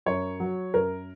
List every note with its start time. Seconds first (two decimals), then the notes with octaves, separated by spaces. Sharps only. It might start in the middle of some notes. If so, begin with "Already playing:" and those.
0.06 F#2 C#5
0.40 F#3
0.74 F#2 A#4